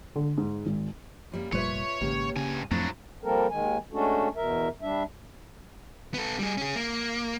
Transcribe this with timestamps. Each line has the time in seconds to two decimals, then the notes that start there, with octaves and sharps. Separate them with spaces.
0.16 D3
0.38 G#2
0.66 G#1
1.32 F#2 G3 A#3
1.53 F1 A#2 G3 F4 B4 C#5 E5
2.01 G#1 C#3 A#3 G4
2.36 G2 C#3 G#5
2.71 F2 F3 F#3 A3 C4 D4 E4 A4
3.23 F3 G3 A#3 C4 A4 A#4
3.50 D#2 D#3 G#3 G#5
3.93 G#3 A3 C#4 D4 F#4 A4
4.36 E2 B2 A#4 E5
4.82 G3 D4 E5
6.14 B3 A4
6.39 G3 G#4
6.57 C#4 G#4
6.75 A#3